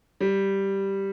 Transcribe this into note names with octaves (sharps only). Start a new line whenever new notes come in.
G3